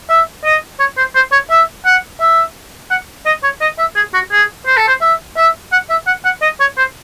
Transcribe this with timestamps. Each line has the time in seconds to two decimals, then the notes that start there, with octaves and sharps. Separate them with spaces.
0.09 E5
0.44 D#5
0.79 C#5
0.97 C5
1.15 C5
1.32 C#5
1.50 E5
1.85 F#5
2.20 E5
2.91 F#5
3.26 D#5
3.43 C#5
3.61 D#5
3.78 E5
3.95 G#4
4.14 F#4
4.32 G#4
4.66 C5
4.77 A4
4.88 C5
5.01 E5
5.37 E5
5.72 F#5
5.90 E5
6.07 F#5
6.25 F#5
6.42 D#5
6.60 C#5
6.77 C5